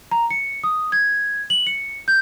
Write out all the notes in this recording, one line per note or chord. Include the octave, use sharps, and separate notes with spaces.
A#5
C#7
D#6
G#6
F#7
C#7
G6